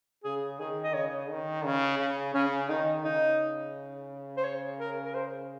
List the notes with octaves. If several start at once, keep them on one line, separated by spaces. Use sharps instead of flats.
C#3 G#4
D#3 G#4
D#5
C#3 C#5
D#3
C#3 C#4
C#3
C#3 C#4
D#3 D#4
C#3 D#4
C5
C#5
A#4
A#4
C5